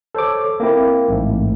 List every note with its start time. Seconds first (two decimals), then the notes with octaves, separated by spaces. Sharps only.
0.15 A4 C5 C#5 D6
0.60 A#3 C4 E4
1.08 A1 G#2 A3